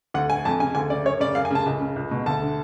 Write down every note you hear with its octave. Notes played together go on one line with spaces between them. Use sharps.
D2 F#5
D3 G#5
F2 A5
C#3 G#5
D2 G#5
C#3 D5
F#2 C#5
C#3 D5
F#2 F5
G#5
C#3 A5
C#2
C#3
C#2
B2
D2 A5
D3